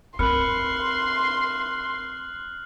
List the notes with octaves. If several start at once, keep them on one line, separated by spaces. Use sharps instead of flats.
C4 A#4 B5 C6 F6 F#6 C#7 F#7